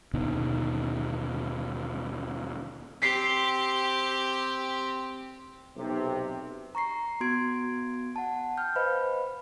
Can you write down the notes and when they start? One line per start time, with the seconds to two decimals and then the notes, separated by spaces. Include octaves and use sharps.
0.14 D#2 B2 D3 D#3
3.02 C4 G4 B6 C7
5.77 B1 C3
6.75 A#5 C#6 A#6 C7
7.20 B3 F#4 C6 G#6 D7
8.16 F#5 A5
8.57 G5 F6 G6
8.75 B4 C5 D#5 F5 B5